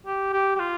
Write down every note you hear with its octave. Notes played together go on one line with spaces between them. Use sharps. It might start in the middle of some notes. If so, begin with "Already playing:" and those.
G4
G4
G4
F4